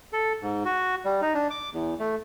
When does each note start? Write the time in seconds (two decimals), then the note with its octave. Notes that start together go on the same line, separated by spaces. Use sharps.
0.13 A4
0.42 G#2
0.65 F#4
1.05 G3
1.22 D#4
1.34 D4
1.50 D6
1.73 E2
1.99 A3